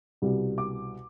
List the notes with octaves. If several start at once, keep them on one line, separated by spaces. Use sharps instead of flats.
C2 B2 G3
D6